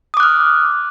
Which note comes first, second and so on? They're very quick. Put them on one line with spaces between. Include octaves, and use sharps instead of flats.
D#6 D6 F#6 F6